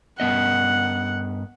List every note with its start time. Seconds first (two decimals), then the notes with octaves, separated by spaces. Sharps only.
0.20 G2 B3 D#5 F#5